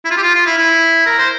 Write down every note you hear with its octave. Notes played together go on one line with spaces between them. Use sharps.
E4
F4
G4
F4
F4
E4
E4
A#4
C5